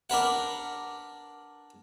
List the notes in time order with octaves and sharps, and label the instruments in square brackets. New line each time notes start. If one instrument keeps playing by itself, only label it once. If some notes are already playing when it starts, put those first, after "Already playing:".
[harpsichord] D4 A#4 B4 F#5